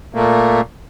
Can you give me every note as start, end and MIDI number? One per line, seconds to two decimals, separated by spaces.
0.14 0.61 46
0.14 0.61 57
0.14 0.61 58